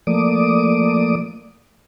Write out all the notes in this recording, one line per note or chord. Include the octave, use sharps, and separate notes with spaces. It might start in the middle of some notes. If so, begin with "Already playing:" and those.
F3 A3 A#3 D5 D6 D#6